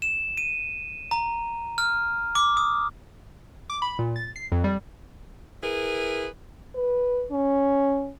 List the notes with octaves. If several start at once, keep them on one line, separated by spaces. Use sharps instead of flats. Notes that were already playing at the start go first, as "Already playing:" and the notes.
E7
D#7
A#5
F6
D6
D#6
D6
B5
A#2
A6
C7
F2
G3
E4 G#4 A#4 B4
B4
C#4